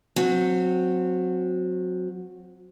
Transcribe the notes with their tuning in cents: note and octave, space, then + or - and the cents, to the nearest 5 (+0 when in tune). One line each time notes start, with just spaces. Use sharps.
F#3 -20 C4 +0